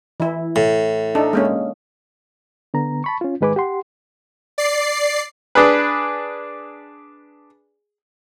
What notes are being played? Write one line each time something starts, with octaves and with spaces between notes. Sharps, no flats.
E3 E4
A2
D4 D#4 A4
G#3 A#3 C#4
D3 B3 A#5
A5 B5 C#6
C#4 F4
G#2 D#3 G#3 B4 G#5 D6
G4 F#5 C6
D5 C7
D4 G#4 B4